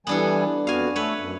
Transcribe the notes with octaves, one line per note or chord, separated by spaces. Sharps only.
E3 G3 B3 D4 A4 G#5
F2 B3 F#4 F5 G#5
A3 A4 B4 C#5
F#2